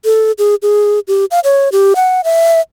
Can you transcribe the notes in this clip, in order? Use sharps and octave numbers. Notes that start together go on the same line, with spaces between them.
A4
G#4
G#4
G4
F5
C#5
G4
F#5
E5